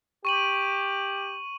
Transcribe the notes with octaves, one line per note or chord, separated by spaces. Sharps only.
G4 C#6 D#7 F#7